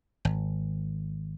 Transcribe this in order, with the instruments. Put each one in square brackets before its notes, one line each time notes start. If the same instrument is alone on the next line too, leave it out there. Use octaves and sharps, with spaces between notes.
[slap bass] G#1